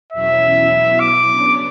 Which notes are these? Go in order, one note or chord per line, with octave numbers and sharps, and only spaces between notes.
E2 B2 F#3 C#4 E4 E5
B2 F#3 B3 E4
D6
C#3 F#3 B3 D4